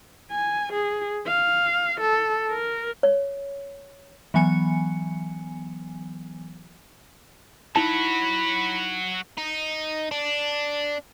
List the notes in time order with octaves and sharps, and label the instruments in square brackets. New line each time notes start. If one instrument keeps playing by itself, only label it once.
[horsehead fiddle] G#5
G#4
F5
A4
A#4
[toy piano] C#5
[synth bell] E3 F#3 B3 G#5 C#7
[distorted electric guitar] F#3 F#4 [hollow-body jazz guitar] D#4 E4 A5 [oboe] B5
[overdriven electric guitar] D#4
D4